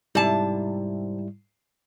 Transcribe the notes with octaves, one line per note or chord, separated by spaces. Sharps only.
G#2 C3 G3 E4 A5